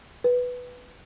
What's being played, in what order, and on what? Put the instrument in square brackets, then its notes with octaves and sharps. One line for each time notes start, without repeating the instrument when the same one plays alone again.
[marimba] B4